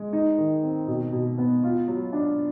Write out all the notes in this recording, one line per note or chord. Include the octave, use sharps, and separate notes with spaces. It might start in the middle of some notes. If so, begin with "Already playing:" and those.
Already playing: G#3
D#4
D#3
C4
B2
B2
B3
F4
F#3
D4